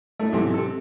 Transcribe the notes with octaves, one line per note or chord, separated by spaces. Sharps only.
A2 A3
B1 G#2 C3 E3 A4
C3 A4